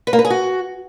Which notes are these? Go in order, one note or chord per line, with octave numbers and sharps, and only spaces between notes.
B4
A#3
B4
G#4
F#4